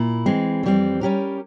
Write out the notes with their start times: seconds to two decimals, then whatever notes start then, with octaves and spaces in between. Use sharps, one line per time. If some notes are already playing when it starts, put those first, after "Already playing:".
Already playing: A#2 E4
0.26 E3 G#3 C4
0.63 F2 E3 G3 C4
1.01 G3 C#4 G4 A#4